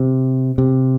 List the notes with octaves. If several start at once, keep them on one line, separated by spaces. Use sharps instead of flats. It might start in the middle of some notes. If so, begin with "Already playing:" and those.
Already playing: C3
C3